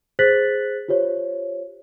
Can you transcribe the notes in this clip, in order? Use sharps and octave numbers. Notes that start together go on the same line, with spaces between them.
G#4 C5 F#6 A6 B6 F#7
F4 G4 C5 C#5